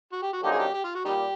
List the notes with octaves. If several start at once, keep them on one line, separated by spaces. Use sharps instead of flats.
F#4
G4
F#4
F#2 D3 F3 A#3 D#4 G4
G#4
G4
G4
F4
F#4
A#2 G3 D#4 G4